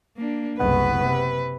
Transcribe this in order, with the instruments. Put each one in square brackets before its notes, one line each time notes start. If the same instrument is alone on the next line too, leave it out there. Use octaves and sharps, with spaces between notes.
[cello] A#3 D4
[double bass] F#1 C2 [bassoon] B3 [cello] B4
[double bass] C3